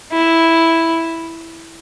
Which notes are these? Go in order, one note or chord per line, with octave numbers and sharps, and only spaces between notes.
E4